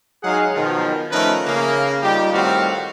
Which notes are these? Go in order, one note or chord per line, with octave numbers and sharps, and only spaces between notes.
F#3 G#3 D#4 G#4 F5 F#5
B2 D#3 F3
F3 A3 C#4 D#4 A#4 B4
C#3 A#3
G3 D#4 F4 G4
A2 D#3 G3 C4 F#4 F5